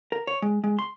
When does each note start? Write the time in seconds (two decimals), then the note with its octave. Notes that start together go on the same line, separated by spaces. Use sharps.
0.12 A#4
0.27 C#5
0.42 G#3
0.64 G#3
0.79 C6